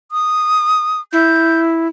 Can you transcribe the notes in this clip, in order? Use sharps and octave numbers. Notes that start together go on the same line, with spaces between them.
D#6
E4 G6